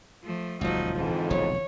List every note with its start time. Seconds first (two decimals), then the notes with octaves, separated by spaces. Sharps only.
0.24 F3 A3
0.61 D#1 C#2 F3 F#3 D#4
0.96 F2 G#2 D3 E3
1.30 F1 B1 C#5